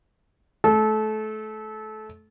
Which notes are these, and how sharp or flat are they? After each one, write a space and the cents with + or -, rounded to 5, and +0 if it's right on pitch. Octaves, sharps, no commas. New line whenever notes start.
A3 -25 A4 -25